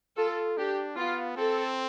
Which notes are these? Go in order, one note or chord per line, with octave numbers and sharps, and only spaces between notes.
F4 A4
D4 G4
B3 F4
C4 A4